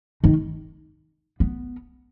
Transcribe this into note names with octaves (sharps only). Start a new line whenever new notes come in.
D#3
B3